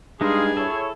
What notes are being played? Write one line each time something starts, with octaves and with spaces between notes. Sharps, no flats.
G2 G#3 D#4 G#4 F5 C6 D#6 G#6
E4 A4 C#5